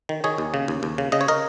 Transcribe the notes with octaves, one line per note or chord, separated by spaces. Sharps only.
D#3
D#3 G#4 C#5
D#2
C#3
D#2
D#2
C#3
C#3 D#5
C#5
A#4 D#5